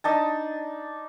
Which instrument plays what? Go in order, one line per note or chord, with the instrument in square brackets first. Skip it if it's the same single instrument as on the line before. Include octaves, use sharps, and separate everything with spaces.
[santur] D4 D#4 A5